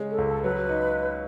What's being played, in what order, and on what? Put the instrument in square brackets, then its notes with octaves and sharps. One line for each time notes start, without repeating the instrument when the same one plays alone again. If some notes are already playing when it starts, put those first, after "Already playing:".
Already playing: [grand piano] C#3 G#3 C#4
[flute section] A4
[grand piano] C#2
[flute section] A4
[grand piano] F#3 [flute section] B4
[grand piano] D#4